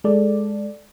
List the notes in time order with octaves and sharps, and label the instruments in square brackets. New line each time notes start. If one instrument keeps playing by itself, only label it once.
[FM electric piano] G#3 A4 D5